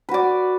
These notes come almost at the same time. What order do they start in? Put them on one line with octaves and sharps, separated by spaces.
B4 F#4 D5